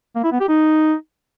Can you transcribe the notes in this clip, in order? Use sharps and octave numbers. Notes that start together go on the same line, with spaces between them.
A#3
E4
B3
G4
D#4